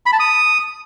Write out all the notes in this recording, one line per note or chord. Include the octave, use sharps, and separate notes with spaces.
B5
A5
D#6